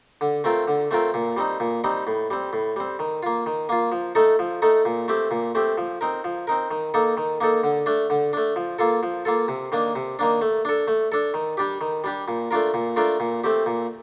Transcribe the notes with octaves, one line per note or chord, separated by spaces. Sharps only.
D3
A3 C4 F4 A#4
D3
A3 C4 F4 A#4
A#2
G3 C4 D#4
A#2
G3 C4 D#4
A2
G3 C4
A2
G3 C4
D#3
A#3 F4
D#3
A#3 F4
F3
A3 D#4 A4
F3
A3 D#4 A4
A#2
A3 C4 G4
A#2
A3 C4 G4
F3
C4 D#4 A#4
F3
C4 D#4 A#4
D#3
A#3 D#4 A4
D#3
A#3 D#4 A4
D3
A3 D4
D3
A3 D4
F3
A#3 F4 A4
F3
A#3 F4 A4
C3
D#3 A#3 D4
C3
D#3 A#3 D4
A3
D4 A4
A3
D4 A4
D#3
G3 D4 G4
D#3
G3 D4 G4
A#2
A3 D4 F4 A#4
A#2
A3 D4 F4 A#4
A#2
A3 C4 G4
A#2